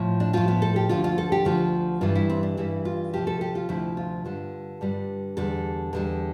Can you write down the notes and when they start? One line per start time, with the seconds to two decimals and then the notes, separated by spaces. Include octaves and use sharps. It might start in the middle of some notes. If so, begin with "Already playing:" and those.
Already playing: A2 F3
0.20 D4
0.33 A2 F3 F4
0.48 B3
0.62 A4
0.76 G4
0.89 D2 D3 F3 F4
1.04 F4
1.18 A4
1.32 G4
1.45 D2 D3 F3 F4
2.01 G2 E3 G3 F4
2.15 E4
2.30 C4
2.43 D4
2.57 G2 E3 G3 E4
2.85 F4
3.13 D2 C3 F3 G4
3.27 A4
3.41 G4
3.55 F4
3.69 D2 C3 F3 E4
3.97 F4
4.25 G2 D3 G3
4.81 G2 D3 G3
5.37 E2 D3 G3 A4
5.93 E2 D3 G3